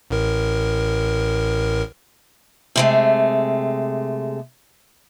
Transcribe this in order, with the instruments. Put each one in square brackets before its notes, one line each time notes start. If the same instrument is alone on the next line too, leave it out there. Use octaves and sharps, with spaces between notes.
[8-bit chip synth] A1 A2 A#4
[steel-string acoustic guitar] C3 G#3 A3